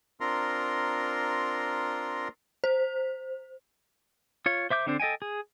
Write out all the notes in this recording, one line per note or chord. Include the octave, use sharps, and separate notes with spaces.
C4 D4 F4 A#4 A#5 C6
C5
F4 C#5
C5 E5 D6 G6
D3 C4 D4 A4 C5
A4 D#5 G5 G#5
G#4